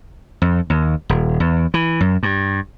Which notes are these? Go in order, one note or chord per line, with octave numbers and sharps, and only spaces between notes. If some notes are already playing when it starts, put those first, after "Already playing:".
F2
D#2
D#1
E2
E3
F#2
G2